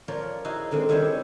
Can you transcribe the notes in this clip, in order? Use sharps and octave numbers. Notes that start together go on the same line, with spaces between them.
F3 F4 A#4 C#5 D5
D#4 E4 F#4 G#4
D3 D#3 G#3 C4
D#3 G3 D4 E4 C#5 G5